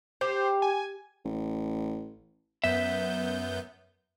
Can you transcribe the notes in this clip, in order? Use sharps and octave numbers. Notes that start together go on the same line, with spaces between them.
G4 C5
G#5
A1
F#2 B3 E5 G6